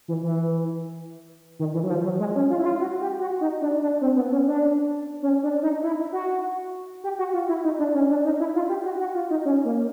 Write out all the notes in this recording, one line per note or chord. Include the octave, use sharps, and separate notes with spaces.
E3
E3
D#3
E3
F#3
F3
F#3
G#3
C#4
F4
E4
F4
F#4
G4
F#4
D#4
D4
D4
C4
B3
C#4
D4
C#4
D4
D#4
E4
F#4
G4
F#4
F4
E4
D#4
D4
C#4
D4
D#4
E4
F4
G4
F#4
F#4
F4
D#4
C#4
A#3